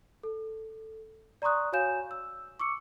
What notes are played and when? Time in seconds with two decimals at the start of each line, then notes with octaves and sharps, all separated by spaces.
0.23 A4
1.42 D5 A#5 C6 C#6 D#6 F#6
1.73 F#4 C#5 F5 G#5 G6 E7
2.11 E6
2.60 C#6 D6 E6 C#7